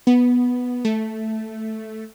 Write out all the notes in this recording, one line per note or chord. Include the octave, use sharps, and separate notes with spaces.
B3
A3